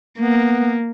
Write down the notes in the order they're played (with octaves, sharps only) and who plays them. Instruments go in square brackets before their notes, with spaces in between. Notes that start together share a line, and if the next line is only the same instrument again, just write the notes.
[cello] A#3 [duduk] B3